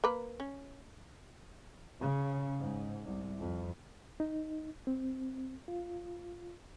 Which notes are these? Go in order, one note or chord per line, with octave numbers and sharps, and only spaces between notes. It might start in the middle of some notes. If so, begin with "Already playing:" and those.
A#3 A#4 B4
C#4
C#3
G#2
C2
F2
D#4
C4
F4